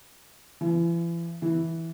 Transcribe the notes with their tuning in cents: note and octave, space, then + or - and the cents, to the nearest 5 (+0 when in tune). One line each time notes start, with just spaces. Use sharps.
E3 +40
E3 -5